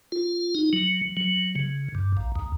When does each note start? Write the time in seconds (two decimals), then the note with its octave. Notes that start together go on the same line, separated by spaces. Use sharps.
0.12 F4
0.55 D#4
0.73 F#3
1.17 F#3
1.56 C#3
1.95 G2
2.17 A#1
2.36 D#2